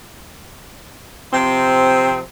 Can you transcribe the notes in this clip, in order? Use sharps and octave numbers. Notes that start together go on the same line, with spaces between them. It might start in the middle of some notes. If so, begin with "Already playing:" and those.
C3 F3 C4